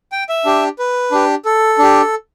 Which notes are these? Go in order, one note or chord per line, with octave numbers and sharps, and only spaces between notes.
G5
E5
D4 G4
B4
D4 G4
A4
D4 G4